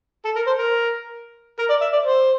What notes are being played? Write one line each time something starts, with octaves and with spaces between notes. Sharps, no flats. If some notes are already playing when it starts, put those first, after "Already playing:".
A4
A#4
C5
A#4
A#4
D5
E5
D5
C5